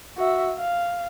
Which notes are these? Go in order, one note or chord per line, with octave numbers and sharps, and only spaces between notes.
F#4 E5
F5